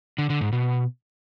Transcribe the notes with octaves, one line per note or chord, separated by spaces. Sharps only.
D3
D3
G#2
B2